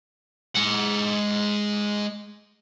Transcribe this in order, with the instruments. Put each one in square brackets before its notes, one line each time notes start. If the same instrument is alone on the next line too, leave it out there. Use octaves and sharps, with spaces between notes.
[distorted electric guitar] G#3 F#5